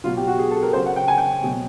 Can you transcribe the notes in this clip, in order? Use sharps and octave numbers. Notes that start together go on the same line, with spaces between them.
B2 F#3 F4
G4
F#4
G#4
A4
A#4
C#3 F#3 C5
F#5
G5
G#5
G5
B2 F#3